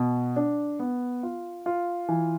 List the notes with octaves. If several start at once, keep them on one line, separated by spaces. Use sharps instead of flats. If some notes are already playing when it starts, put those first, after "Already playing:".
Already playing: B2
D4
B3
F4
F4
E3